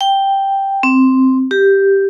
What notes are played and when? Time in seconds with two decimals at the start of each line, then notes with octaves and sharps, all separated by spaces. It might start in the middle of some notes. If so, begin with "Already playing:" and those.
0.01 G5
0.83 C4
1.51 G4